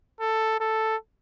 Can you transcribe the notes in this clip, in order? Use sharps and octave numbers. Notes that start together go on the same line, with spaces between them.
A4
A4